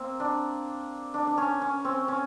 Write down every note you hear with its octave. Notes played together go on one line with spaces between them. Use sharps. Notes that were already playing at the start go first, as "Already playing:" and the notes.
Already playing: A#3 C4
D4
D4
D4
C#4
C#4
C4
C#4